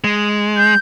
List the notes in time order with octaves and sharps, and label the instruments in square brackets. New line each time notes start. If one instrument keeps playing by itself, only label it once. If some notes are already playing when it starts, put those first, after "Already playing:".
[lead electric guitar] G#3
[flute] G6